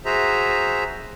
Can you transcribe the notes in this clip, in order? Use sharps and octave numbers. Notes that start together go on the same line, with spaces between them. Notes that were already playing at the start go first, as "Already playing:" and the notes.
F#4 G#4 C5 E5 A#5